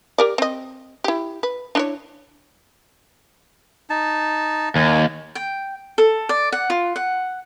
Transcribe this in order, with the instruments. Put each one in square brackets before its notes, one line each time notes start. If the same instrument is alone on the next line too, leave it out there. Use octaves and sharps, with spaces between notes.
[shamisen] G4 A#4 D5
C4 D#5
E4 G4
B4
D4 E4 C#5
[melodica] D#4 A5
[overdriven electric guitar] D#2 [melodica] G#5
[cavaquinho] G5
A4
D5
F#5
F4
F#5